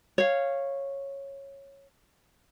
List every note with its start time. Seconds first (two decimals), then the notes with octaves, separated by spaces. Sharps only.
0.18 C#5 F5